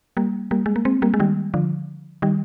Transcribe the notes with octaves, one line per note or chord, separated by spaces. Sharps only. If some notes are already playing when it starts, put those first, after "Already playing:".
G3 A#3
G3 A#3
G#3
A#3
G#3 C4
G3 A#3
G#3
D#3 G3
D3 F3
D#3 G3